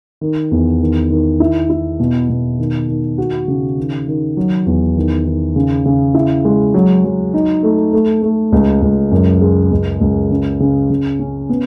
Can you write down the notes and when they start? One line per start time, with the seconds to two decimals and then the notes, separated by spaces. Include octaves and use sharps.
0.21 D#3
0.51 E2
0.80 D#3
1.10 D#3
1.40 E4
1.70 E4
2.00 B2
2.29 B2
2.59 D#3
2.88 D#3
3.18 F#4
3.48 C#3
3.77 D#3
4.07 D#3
4.37 F#3
4.66 E2
4.96 D#3
5.26 D#3
5.56 C#3
5.85 C#3
6.14 E4
6.45 G#3
6.74 F#3
7.04 F#3
7.34 D#4
7.63 A3
7.93 A3
8.22 A3
8.52 C#2
8.82 C#2
9.11 F#2
9.42 G#3
9.71 C#2
10.01 C#2
10.31 C#3
10.60 C#3
10.90 C#3
11.19 C#4
11.49 B3